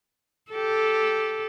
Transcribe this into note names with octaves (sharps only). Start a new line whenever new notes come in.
G4 A4